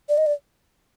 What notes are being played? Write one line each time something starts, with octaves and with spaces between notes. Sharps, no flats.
D5
D#5
D5